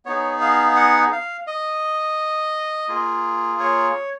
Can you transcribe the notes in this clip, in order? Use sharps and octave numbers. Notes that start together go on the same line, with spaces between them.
B3 D#4 G#4 C#5
F5
F#5
F5
D#5
A#3 F4 G#4
C#5